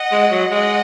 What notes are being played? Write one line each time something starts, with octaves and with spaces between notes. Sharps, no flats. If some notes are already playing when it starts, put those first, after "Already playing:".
Already playing: D#5 F#5
G#3
F#3
G#3 D#5 F#5